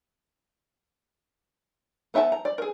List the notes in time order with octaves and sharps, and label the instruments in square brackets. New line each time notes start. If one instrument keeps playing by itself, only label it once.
[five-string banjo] B3 D#4 E5 G5 A5
A#5
D5
G#4 A#4